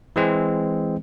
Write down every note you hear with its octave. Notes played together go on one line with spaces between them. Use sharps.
E3 G#3 C4